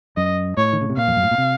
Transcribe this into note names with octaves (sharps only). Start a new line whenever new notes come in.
F#2 D#5
A2 C#5
D#3
C#3
C3
A#2 F5
F2
F#2
A2
A#2
C3